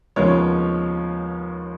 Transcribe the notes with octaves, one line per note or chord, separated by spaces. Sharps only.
D#2 C#3 F3 G#3 B3 C#5